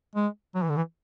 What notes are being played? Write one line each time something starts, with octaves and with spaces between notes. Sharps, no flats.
G#3
F#3
E3
D3
E3